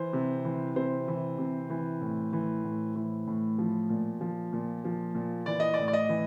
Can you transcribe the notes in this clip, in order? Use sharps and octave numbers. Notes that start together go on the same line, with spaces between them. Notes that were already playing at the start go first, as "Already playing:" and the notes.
Already playing: E3 C5
C3
E3
C3 C5
E3
C3
E3
A2
E3
A2
E3
A2
F3
A#2
F3
A#2
F3
A#2
E3 D5
D#5
A2 D5
D5
D#5
E3